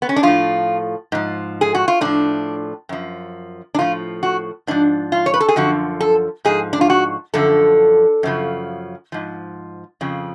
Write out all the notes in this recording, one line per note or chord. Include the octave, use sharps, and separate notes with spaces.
B3
C#4
D4
A2 F3 F4
G#2 F3
G#4
F#4
F4
A2 F3 D4
F#2 F3
D4
A2 F3 F4
F#4
G#2 F3 D4
F4
C#5
B4
A4
G#4
F#2 D3 F3 F#4
A4
G#2 F3 G#4
D4
F4
F#4
F#2 D3 F3 A4
F#2 C#3 F3
G#2 F3
F2 C#3 F3